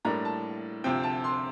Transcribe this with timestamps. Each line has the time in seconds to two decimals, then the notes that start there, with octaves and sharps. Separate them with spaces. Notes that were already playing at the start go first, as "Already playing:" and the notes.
0.05 A2 G3 A#3 D4 A#5
0.25 A5
0.84 D2 C3 F3 C4 G5
1.03 A5
1.24 C6